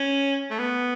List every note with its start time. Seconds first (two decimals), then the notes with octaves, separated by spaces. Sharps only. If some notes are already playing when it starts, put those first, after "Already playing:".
Already playing: C#4
0.51 A3
0.59 B3